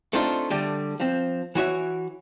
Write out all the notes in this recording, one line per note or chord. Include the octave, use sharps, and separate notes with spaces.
A3 C4 D4 D#4 F4
D3 G3 A3
F3 C4
E3 F#4 C#5 E5